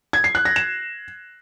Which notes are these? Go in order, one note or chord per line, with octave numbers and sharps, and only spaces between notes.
G#6
C7
F#6
A#6
E7